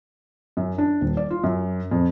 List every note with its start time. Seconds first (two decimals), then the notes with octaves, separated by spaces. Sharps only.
0.57 F#2
0.78 D4
1.01 D#1
1.17 D5
1.30 F4
1.44 F#2
1.91 F2